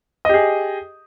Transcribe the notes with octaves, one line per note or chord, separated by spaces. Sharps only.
G4 G#4 D#5